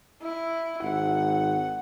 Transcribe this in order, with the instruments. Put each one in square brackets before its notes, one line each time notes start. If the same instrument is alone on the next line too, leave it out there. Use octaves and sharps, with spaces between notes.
[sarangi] E4
[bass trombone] G#1 [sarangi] F#5